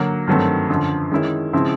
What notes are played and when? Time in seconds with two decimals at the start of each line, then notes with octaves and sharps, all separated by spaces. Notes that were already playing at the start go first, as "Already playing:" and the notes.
Already playing: D3 F#3 A#3
0.27 G2 D#3 F#3 A3 C4
0.69 F#2 D3 F3
1.11 D#3 G#3 C#4 E4
1.53 C#3 F3 G#3 C4 E4